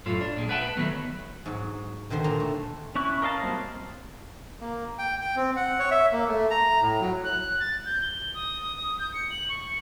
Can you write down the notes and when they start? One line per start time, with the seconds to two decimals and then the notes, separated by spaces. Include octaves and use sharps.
0.06 F#2 A2 F4 A4 C#5
0.21 D4
0.37 A#2 G#3
0.49 B4 E5 F#5 G5 A5
0.61 B4
0.77 D#3 F#3 A3 B3
1.46 G#2 F#3
2.10 B2 D3 D#3 C5 C6
2.24 A#2 D4 G4 A#5 C6
2.40 A3
2.95 C#4 E4 C#6 F#6
3.22 A#4 D#5 F5 A5
3.42 F#3 G3 A#3 C4 C5
4.61 A#3
4.99 G5
5.21 G5
5.36 C4
5.56 F#5
5.79 C#5
5.91 E5
6.12 A#3
6.28 A3
6.51 A#5
6.81 A2
7.01 F#3
7.24 F#6
7.59 A6
7.85 G6
8.02 G7
8.34 D#6
8.99 G6
9.14 C#7
9.30 F#7
9.49 C#6